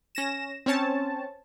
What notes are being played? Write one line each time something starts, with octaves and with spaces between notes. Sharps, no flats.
C#4 A#6 E7
C4 C#4 C#5 A5